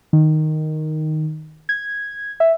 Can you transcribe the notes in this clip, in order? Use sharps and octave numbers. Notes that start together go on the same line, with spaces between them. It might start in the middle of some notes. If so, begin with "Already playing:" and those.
D#3
G#6
E5